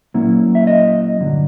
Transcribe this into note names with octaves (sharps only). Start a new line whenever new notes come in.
A#2 F#3 A#3 C#4 E4
E5
D#5
G2 D3 F#3